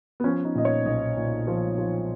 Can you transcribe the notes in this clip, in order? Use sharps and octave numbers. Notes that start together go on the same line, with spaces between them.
B3
F3 C#4
D#4
A#2 D#5
C#5
B1 D#5
A#2
F3
F3